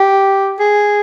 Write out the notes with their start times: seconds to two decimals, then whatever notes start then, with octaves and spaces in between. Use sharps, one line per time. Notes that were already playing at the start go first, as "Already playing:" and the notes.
Already playing: G4
0.60 G#4